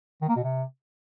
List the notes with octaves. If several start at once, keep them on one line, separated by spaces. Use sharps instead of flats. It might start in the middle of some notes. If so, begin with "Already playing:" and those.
D#3
A#3
B2
C3